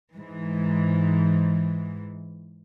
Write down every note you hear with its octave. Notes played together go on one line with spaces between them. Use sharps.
G#2 E3